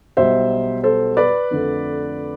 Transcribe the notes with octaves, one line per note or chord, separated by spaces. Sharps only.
B1 B2 G3 C5 E5
A4 C5
B4 D5
F2 D3 A3